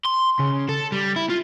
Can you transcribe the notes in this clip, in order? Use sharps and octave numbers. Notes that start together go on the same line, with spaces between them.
C6
C#3
A4
G3
E4
F4